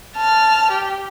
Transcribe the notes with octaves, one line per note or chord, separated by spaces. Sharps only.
A5 F6
G4